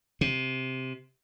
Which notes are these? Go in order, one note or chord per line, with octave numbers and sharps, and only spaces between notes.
C3